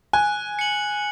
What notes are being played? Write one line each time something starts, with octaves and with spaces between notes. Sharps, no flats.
G#5 F#6
C#7 F#7